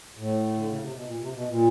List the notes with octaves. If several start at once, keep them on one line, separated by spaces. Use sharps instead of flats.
A2
D3
C#3
C3
B2
A#2
C3
B2
A#2